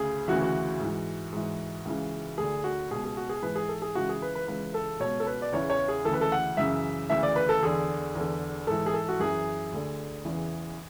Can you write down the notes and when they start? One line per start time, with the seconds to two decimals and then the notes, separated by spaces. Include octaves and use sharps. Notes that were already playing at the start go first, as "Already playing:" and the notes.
Already playing: D2 C#3 G#4
0.28 D2 C#3 E3 F#4
0.42 F#4
0.80 G#2 E3
1.33 G#2 E3
1.85 C#2 C#3 E3
2.38 D2 D3 G#4
2.64 F#4
2.91 C#2 B2 G#4
3.04 G#4
3.17 F#4
3.29 G#4
3.43 G#2 E3 B4
3.55 G#4
3.69 A4
3.82 G#4
3.95 C#2 C#3 E3 F#4
4.09 G#4
4.22 B4
4.35 B4
4.48 C#2 C#3 E3 B4
4.74 A4
5.00 C#2 B2 C#5
5.20 A4
5.26 B4
5.42 D5
5.52 E2 C#3 E3 C#5
5.70 C#5
5.88 G#4
6.05 D2 C#3 E3 A4
6.14 B4
6.21 A4
6.32 F#5
6.57 F#2 C#3 E3 E5
7.10 D2 C#3 E3 E5
7.23 D5
7.36 B4
7.49 A4
7.63 E2 D3 G#4
8.15 E2 D3
8.67 G#2 E3 A4
8.86 G#4
8.94 A4
9.09 F#4
9.20 F#2 E3 G#4
9.73 D2 D3
10.25 E2 C#3 E3